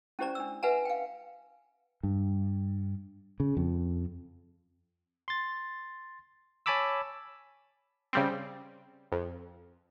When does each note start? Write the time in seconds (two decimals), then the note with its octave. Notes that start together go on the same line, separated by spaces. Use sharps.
0.19 C#4 E4 G4 C5 D5 A#5
0.35 D4 E6
0.63 B4 E5 F#5 G#5 A#5
0.85 F5 G5
2.03 G2
3.40 C#3
3.57 F2
5.28 C6 A6
6.66 C#5 G#5 A5 B5 D6 E6
8.13 C#3 G3 C4
9.12 F2